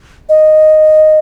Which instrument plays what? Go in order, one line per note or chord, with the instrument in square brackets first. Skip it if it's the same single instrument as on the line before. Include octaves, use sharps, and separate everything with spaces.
[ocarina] D#5